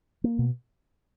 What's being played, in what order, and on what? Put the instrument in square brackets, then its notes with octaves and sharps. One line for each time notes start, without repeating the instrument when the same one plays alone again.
[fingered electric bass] A#3
B2